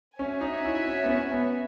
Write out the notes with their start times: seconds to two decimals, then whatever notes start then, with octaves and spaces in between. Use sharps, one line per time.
0.19 C#4 F#4 C#5 E5 G#5
0.41 D#4
0.65 E4
0.86 C#4
1.04 B3
1.08 C#4
1.32 B3